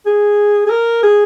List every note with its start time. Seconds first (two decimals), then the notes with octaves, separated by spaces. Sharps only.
0.06 G#4
0.66 G#4
0.70 A#4
1.03 G#4